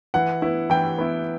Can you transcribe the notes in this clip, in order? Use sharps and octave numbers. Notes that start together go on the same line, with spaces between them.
E3 F#5
B3 E4
E3 G5
B3 E4